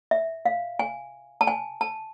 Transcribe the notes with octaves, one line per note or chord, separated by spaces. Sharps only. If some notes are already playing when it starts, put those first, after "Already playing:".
E5
F5
G#5
A5
G#5
A5